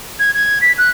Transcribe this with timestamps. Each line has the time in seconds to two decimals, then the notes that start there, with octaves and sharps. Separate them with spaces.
0.19 G#6
0.34 G#6
0.61 B6
0.78 F#6